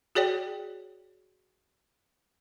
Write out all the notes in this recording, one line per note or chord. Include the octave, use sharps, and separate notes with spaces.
F#4 G#4 C#5 D5 G5